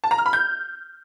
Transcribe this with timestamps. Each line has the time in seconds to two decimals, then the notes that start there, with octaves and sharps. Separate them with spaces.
0.04 A5
0.11 A#5
0.18 F6
0.26 B5
0.33 G6